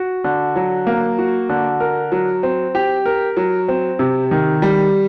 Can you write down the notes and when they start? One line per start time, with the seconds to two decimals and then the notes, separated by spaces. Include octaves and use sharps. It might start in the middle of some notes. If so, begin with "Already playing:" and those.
Already playing: F#4
0.24 D3
0.56 F#3
0.87 A#3
1.18 F#4
1.49 D3
1.80 A#4
2.12 F#3
2.43 C4
2.75 G4
3.06 A#4
3.37 F#3
3.68 C4
3.99 C3
4.31 D#3
4.62 G3